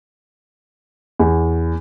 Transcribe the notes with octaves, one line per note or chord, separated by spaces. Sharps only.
E2